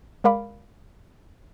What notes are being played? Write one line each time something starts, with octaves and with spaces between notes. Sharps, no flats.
G#3 A#4 D5 F5 B5 D6